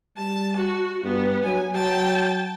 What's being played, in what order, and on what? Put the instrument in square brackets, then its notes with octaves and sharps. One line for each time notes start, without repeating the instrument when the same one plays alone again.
[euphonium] G3 [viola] A5
[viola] F#4
[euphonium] G2 [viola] B3
[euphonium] F#3 [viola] G#5
[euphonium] F#3 [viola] G5 A5